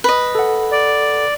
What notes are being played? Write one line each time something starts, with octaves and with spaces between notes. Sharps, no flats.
B4 D#5
A4 F#5
D5